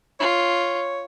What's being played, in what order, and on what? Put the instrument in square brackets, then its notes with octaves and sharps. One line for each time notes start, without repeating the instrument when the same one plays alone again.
[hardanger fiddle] F4 [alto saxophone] C#5